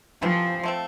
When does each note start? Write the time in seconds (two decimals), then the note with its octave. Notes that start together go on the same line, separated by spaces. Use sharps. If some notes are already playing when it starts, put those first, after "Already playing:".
0.22 C3 E3 F3 A3 C4
0.63 F3 A3 C4